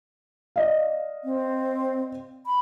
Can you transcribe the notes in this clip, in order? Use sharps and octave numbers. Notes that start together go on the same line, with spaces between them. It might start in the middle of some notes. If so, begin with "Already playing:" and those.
D5 D#5 F5
C4
B5